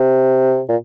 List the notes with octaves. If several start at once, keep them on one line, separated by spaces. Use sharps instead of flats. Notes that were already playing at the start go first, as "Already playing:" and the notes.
Already playing: C3
A#2